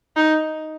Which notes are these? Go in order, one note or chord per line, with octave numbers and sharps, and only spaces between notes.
D#4